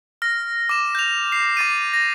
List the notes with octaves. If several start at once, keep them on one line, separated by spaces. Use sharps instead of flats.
F6 A#6
D6 E7
G6 F7
C7
D6 A6 D#7
A#6